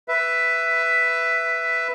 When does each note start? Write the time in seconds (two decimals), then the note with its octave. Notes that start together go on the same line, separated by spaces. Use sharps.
0.08 B4 E5